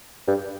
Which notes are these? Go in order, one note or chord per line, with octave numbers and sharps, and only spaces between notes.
G2